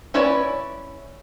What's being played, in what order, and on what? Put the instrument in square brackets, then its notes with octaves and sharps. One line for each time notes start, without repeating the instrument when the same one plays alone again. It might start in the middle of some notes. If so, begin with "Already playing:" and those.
[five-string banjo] C#4 E4 B4 C#5 D5